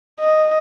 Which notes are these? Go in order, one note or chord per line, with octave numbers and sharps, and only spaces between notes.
D#5